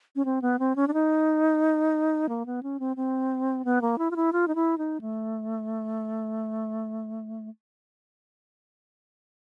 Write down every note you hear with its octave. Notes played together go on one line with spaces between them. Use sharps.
C#4
C4
B3
C4
C#4
D4
D#4
A#3
B3
C#4
C4
C4
B3
A#3
E4
F4
E4
F4
D#4
E4
D#4
A3